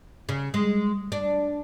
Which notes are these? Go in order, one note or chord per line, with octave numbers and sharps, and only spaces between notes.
C#3
G#3
D4